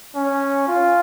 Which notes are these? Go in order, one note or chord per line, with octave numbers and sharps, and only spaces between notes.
C#4
F4